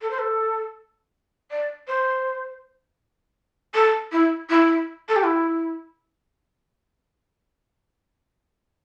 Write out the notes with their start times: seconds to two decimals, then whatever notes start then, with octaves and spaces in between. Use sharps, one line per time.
0.02 A4
0.10 C5
0.19 A4
1.51 D5
1.87 C5
3.74 A4
4.12 E4
4.49 E4
5.09 A4
5.16 G4
5.23 E4